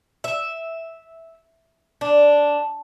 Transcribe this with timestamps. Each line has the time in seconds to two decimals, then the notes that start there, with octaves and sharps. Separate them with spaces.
0.24 E5
2.01 D4